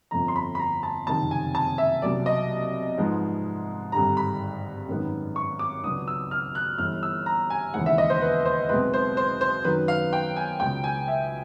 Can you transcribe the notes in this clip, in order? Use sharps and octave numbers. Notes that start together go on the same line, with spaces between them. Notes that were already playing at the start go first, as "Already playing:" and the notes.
G1 F2 D3 F3 A#5
C6
B5
B5
A#5
A5
F#1 F2 C3 D#3 A5
G#5
A5
E5
C2 B2 F#3 A#3 D5
D#5
G#2 F3 G#3 B3
G#1 G2 D3 G3 A#5
B5
G#1 F#2 D#3 G#3 B3
C#6
D6
C#2 B2 F#3 B3 D4 D#6
E6
F6
F#6
G1 G2 E3 F6
E6
A#5
G#5
E1 D#2 C#3 E3 G#3 F#5
E5
D#5
C5
B4
C5
B1 B2 G#3 C4 B4
C5
C5
C5
F#2 D#3 F#3 B3 B4
F5
G5
G#5
C#2 B2 G#3 G5
G#5
E5